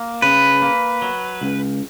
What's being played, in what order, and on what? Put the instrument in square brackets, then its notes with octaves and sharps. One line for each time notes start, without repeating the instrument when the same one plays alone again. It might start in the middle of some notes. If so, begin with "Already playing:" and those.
Already playing: [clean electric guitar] A#3
[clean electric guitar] C#3 [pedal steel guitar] B4
[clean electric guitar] A#3
F#3
C#2